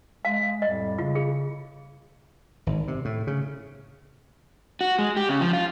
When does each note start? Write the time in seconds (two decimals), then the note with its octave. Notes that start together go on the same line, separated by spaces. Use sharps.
0.25 G#3 F5
0.62 F2 A2 G3 D#5
0.98 C#3 F4
1.15 G#4
2.66 G#1
2.88 C3
3.05 A2
3.27 C#3
4.81 F#4
4.98 G#3
5.17 G4
5.29 C#3
5.41 F3
5.53 F4